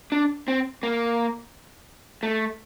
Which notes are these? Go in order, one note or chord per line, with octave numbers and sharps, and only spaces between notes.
D4
C4
A#3
A3